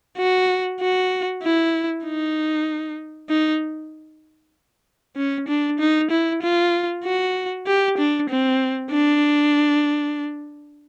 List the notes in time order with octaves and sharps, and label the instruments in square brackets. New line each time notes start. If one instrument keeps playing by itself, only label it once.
[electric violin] F#4
F#4
E4
D#4
D#4
C#4
D4
D#4
E4
F4
F#4
G4
D4
C4
D4